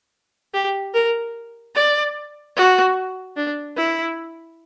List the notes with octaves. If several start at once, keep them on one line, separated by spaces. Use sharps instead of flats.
G4
A#4
D5
F#4
D4
E4